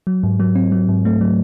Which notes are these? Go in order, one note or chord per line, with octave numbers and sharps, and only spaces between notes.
F#3
G#2
F#3
C4
F#3
G#2
A3
F#3